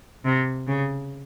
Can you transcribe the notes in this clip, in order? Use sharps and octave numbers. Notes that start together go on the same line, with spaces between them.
C3
C#3